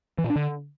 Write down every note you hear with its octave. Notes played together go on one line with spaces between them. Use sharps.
E3
A#2
D4
D3